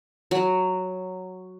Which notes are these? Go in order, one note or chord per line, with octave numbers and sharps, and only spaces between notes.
F#3